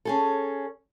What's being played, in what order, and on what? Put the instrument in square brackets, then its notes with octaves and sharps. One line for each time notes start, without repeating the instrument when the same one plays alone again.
[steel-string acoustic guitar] C#4 G#4 A4